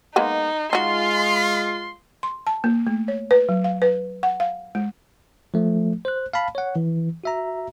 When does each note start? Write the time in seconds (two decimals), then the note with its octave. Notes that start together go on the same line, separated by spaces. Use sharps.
0.16 G#3 A#3 B3 D#4
0.73 G#3 D#4 F4 F#4 C6
2.23 C6
2.47 A5
2.64 A#3
2.87 A3
3.08 C#5
3.31 B4
3.49 F#3
3.64 F5
3.82 B4
4.23 F#5
4.40 F5
4.75 G#3
5.54 F3 A3
6.05 C5 F#6
6.33 F5 A5 B5
6.55 C#5 F#5
6.76 E3
7.24 F#4 E5 A#5